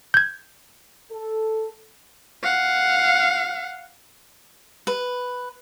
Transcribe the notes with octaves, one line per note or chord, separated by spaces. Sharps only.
G6 G#6
A4
F5 F#5
B4